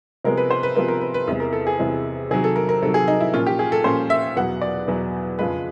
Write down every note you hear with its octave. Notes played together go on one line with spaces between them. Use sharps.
C3 F3 G#3 B3 A#4
B4
C5
B4
C3 F3 G#3 B3 A#4
A#4
B4
B4
E2 C3 E3 G#3
A#4
A4
G#4
E2 C3 E3 G#3
C3 D#3 F#3 G#4
A4
A#4
A#4
C3 D#3 F#3 A4
G#4
D#4
E4
A#2 F3 A#3 C#4 F4
G4
G#4
A4
A#2 F3 A#3 C#4 C5
E5
E2 B2 F#3 F#5
D5
E2 B2 F#3
F2 C#3 F3 G#3 B4